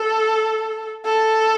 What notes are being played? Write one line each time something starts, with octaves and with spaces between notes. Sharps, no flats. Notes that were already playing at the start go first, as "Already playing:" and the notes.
Already playing: A4
A4